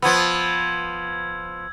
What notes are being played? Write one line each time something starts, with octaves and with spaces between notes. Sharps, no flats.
F3 B3 E6 G#6